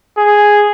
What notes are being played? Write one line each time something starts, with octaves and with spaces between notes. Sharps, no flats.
G#4